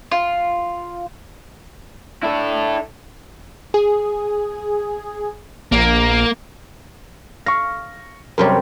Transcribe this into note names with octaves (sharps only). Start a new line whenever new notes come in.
F4
D4 E4 A4
G#4
A#1 A#3 D7
F5 C#6 A#6
F#2 C3 G3 A#4 C#5